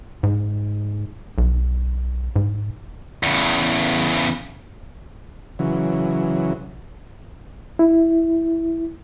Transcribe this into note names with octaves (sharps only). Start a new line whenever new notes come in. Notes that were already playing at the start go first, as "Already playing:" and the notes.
G#2
B1
G#2
E2 C#3
C#3 E3 F#3
E4